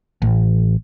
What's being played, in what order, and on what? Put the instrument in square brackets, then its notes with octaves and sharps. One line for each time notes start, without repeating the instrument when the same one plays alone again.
[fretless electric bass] A1